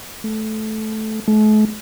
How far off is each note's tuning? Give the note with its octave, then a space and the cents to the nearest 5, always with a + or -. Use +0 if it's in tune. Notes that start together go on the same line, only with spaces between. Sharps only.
A3 -15
A3 -45